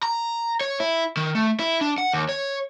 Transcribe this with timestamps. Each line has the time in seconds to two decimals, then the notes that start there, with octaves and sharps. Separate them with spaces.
0.03 A#5
0.61 C#5
0.80 E4
1.17 D#3
1.35 A3
1.60 E4
1.81 D4
1.98 F#5
2.13 D#2
2.29 C#5